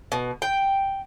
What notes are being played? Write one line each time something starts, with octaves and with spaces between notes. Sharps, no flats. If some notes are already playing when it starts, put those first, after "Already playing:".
B2
G5